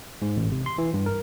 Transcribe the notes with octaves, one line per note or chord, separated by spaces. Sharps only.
G#2
A1
C3
C6
E3
G2
A#4